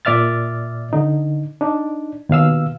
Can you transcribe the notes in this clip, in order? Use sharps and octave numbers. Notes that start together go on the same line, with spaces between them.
A#2 D5 E5 F6 A6
D3 D#4
D4 D#4
D#2 B2 F5 E6